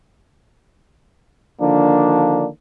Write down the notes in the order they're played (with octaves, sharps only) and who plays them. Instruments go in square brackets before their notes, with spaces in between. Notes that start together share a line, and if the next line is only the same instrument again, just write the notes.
[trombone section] D3 D#3 F3 A#3 D4